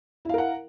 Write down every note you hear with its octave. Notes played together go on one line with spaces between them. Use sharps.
E4 A#4 F5 F#5